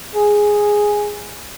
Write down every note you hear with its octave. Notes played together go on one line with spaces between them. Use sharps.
G#4